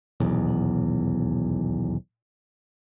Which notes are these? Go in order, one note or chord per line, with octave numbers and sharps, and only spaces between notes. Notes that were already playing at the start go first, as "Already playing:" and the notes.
D#1 B1 E2